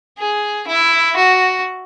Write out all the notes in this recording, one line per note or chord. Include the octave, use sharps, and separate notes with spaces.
G#4
E4
F#4